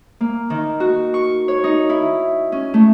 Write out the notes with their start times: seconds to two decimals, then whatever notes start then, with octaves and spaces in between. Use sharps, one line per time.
0.21 A#3
0.50 D#3
0.80 F#4
1.14 C#6
1.48 C#5
1.64 D#4
1.89 E4
2.52 C#4
2.74 A3